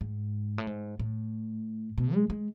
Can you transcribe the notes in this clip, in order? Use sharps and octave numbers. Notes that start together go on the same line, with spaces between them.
G#2
A2
G#2
A2
B2
G#3
G#3